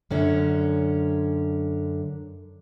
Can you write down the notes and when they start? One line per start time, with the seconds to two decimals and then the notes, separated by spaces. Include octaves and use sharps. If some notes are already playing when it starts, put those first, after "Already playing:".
0.11 F#2 D3 C#4